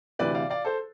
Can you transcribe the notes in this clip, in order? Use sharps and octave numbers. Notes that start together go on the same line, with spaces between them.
D2 C3 E3 B4 D5
D5 F5
D5 F5
A4 C5